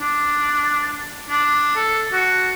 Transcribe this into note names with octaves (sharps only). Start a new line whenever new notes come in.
D4
D4
A4
F#4